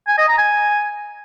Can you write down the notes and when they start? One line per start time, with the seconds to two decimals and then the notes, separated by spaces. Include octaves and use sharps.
0.08 G#5
0.18 D#5
0.28 A#5
0.38 G#5